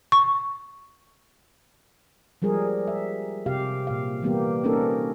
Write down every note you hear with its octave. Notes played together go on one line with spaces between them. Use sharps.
C#6
F3 G3 G#3 G#4 A#4
E5
C3 G4 F5
A#2 F5
E3 G3 A#3 B3 G4
A#3 C4 C#4 D#4 A4 A#4